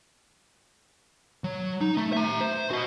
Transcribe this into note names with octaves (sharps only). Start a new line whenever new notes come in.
F#3
D#4
A3
E5 A#5
C5
F#4 D#5